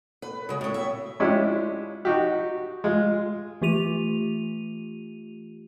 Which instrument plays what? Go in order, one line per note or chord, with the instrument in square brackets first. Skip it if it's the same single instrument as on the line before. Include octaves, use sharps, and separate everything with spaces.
[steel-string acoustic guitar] B4
C#3 G#3
A2 C#4
E5
[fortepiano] G#3 C#4 D4 E4 F4 G4
D#4 F#4 G4
G#3 F4
[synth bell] E3 A3 F4 G4 D#7 F7